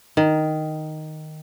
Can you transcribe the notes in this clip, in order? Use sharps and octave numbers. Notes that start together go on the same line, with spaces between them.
D#3